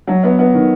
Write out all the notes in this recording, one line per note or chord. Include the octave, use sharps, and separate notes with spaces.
F#3
B3
B3
D#3